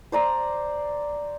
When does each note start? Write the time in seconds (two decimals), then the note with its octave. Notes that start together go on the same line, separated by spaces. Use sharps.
0.12 C5 D5 A#5 C6